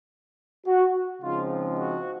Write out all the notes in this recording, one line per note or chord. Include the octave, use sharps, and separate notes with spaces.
F#4
C#3 F3 G#3 C4 D#4 F4
F#4